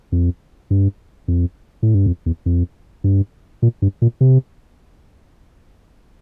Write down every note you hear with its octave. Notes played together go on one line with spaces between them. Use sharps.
F2
G2
F2
A2
G2
F2
E2
F2
G2
A#2
G2
A#2
C3